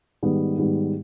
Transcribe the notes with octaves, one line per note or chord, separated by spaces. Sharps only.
G#2 D#3 G3 B3
G#2 D#3 G3 B3